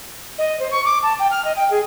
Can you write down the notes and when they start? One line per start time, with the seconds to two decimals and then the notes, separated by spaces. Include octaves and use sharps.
0.39 D#5
0.60 C5
0.71 C#6
0.85 D6
1.03 A5
1.20 G5
1.31 F6
1.45 D#5
1.57 G5
1.71 G#4